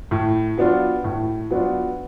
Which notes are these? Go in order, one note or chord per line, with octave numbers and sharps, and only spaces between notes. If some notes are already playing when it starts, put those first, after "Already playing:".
A2
F#3 B3 D4 F4
A2
F#3 B3 D4 F4